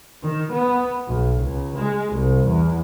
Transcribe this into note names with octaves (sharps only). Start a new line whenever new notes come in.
D#3
B3
B1
C#2
G#3
C2
E2